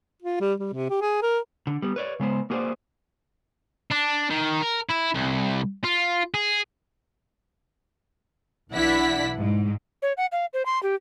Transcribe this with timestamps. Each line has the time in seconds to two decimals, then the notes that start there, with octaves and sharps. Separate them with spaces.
0.22 F4
0.41 G3
0.60 G3
0.73 C3
0.90 G4
1.01 G#4
1.22 A#4
1.67 D3
1.82 G3 B3
1.96 B4 C#5 D5
2.20 C#3 G#3 B3 C5
2.50 A#3 F#4 G#4 B4 C5 D5
3.91 D4
4.30 D#3
4.61 A#4
4.89 E4
5.14 C2
5.84 F4
6.34 G#4
8.72 B1 E3 D4 E4 F#5 B6
9.37 G#2
10.02 C#5
10.17 F#5
10.32 F5
10.53 C5
10.66 C6
10.83 G4